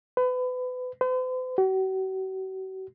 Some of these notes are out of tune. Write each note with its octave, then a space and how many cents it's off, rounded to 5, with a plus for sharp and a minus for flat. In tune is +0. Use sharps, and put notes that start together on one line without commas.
B4 +30
C5 -45
F#4 +45